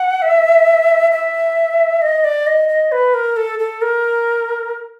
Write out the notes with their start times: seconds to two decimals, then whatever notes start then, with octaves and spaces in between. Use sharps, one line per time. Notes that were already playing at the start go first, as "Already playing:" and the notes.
Already playing: F#5
0.22 E5
1.12 E5
2.02 D#5
2.24 D5
2.47 D#5
2.69 D#5
2.92 B4
3.14 A#4
3.37 A4
3.59 A4
3.82 A#4